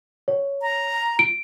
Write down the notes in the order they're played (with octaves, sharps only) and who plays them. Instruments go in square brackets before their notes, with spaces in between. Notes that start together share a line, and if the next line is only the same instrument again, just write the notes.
[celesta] C#5
[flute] A#5
[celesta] D7